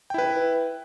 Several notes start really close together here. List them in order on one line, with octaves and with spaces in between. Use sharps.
G5 E4 B4